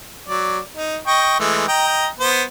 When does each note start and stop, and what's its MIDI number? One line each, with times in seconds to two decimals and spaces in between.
0.28 0.59 54
0.28 0.59 74
0.77 0.97 63
1.07 1.35 75
1.07 1.35 79
1.07 1.35 85
1.39 1.68 52
1.39 1.68 56
1.39 1.68 57
1.68 2.07 75
1.68 2.07 79
1.68 2.07 82
2.20 2.43 59
2.20 2.43 72